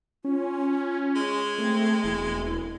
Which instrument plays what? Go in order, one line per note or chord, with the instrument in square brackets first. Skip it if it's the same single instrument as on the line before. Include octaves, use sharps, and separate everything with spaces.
[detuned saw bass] C#4 [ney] F4
[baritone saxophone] G#3
[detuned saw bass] A3 [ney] C4
[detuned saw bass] E1 [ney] E4